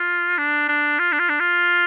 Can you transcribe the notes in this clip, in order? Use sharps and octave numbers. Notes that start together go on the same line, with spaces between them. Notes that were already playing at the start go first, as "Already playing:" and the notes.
Already playing: F4
D4
D4
F4
D4
F4
D4
F4